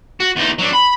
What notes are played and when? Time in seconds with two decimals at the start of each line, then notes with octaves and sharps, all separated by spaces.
0.20 F#4
0.36 E2 D#4
0.59 F#3 D4
0.73 B5